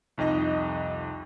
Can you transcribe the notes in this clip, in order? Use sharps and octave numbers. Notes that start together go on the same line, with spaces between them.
C2 F2 D#4 D#5 A#6